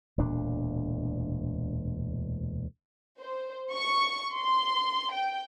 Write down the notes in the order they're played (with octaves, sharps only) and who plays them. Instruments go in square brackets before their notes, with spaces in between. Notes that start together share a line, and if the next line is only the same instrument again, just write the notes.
[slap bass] E1 D2 A#2 D4
[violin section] C5
C#6
C6
G5